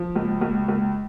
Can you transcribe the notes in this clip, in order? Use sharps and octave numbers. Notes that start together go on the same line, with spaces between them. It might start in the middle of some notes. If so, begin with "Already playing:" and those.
Already playing: F3
C#2
C#2
C#2